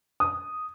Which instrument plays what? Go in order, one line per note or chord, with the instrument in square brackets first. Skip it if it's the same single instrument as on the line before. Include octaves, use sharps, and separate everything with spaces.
[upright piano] D#6